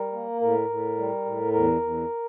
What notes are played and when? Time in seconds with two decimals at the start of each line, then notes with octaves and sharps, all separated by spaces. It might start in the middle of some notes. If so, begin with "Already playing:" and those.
Already playing: G3 A#4
0.13 A#3
0.41 A2 A#4
0.69 A2
0.97 G3
1.25 A2
1.53 E2 A#4
1.82 E2